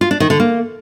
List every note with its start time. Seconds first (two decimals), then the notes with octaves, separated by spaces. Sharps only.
0.01 F4
0.11 D4
0.20 D#3
0.30 D3
0.40 A#3